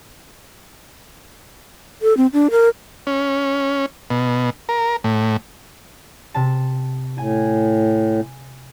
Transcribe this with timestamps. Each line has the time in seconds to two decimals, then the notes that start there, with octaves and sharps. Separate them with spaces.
2.02 A4
2.17 C4
2.33 D4
2.51 A#4
3.07 C#4
4.10 B2
4.69 A#4
5.04 A2
6.34 C3 A5
7.18 A2 G#5